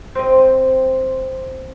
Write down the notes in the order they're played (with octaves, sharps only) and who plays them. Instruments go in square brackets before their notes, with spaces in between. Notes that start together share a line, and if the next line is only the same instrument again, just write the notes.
[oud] C4 D#5